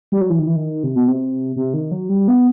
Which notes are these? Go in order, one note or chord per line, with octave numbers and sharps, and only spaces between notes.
G3
F#3
E3
D#3
E3
D#3
C3
B2
C3
C3
D#3
F#3
G3
B3